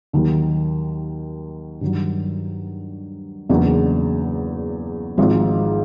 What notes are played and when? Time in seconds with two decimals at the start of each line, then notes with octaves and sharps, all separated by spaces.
0.13 D#2 D#3 F#3
1.81 G2 D#3 F#3
3.49 E2 C#3 F#3 A#3 D4
5.18 G#1 G#2 F3